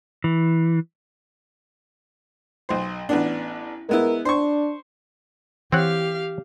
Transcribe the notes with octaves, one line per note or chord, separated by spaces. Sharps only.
E3
B1 C5
A1 B3 D4
G#3 B3 E4 A#4
D4 C5 C#6
E3 C4 G4 C#5 F5 F#5